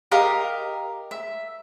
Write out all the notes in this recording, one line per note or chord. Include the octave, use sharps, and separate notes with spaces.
G4 A#4 D#5 F5
E5